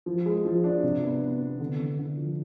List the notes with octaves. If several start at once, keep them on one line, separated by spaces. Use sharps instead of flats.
F3
G#3
F3
D4
C3
B3
B3
B3
D3
D3
D3
F3